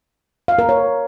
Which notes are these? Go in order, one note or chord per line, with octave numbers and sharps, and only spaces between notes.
F5
A#4
C#5